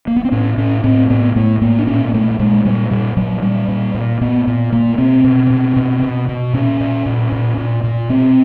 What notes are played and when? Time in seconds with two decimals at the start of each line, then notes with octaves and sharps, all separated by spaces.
0.07 A#3
0.16 B3
0.25 C4
0.32 A2 C#4
0.58 A2 C#4
0.84 A2 C4
1.10 A2 B3
1.36 A2 A3
1.62 A2 A#3
1.79 D4
1.87 A#2 C#4
2.08 A#3
2.14 A#2 A3
2.31 A3
2.39 A#2 G#3
2.65 A#2 G3
2.91 A#2 G3
3.17 A#2 F#3
3.42 A#2 G3
3.68 A#2
3.95 A#2
4.21 A#2 B3
4.47 A#2
4.73 A#2 A#3
4.98 B2 C4
5.24 B2
5.50 B2
5.76 B2
6.03 B2
6.29 B2
6.54 A#2 C#4
6.80 A#2
7.06 A#2
7.32 A#2
7.58 A#2
7.84 A#2
8.09 B2 C4